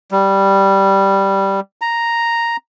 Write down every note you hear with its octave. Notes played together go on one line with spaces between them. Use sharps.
G3
A#5